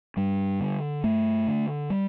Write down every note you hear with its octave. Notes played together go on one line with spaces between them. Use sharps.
G2 G3
D3
G2 A3
D3
G3